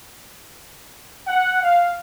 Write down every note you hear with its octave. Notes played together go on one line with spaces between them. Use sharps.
F#5
F5